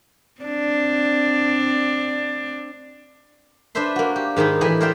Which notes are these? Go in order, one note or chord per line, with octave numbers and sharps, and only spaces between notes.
C4 D4
D4 B4 C5 E5 C6
A#3 F#4
G4
G#2 D#3 G#3 D#4 B5
A2 E3 G4 D#5 G#5 B5
A#4 C5 D5 E5 F5 G5